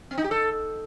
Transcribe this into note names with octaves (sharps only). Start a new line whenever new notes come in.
C4
D#4
G4
A4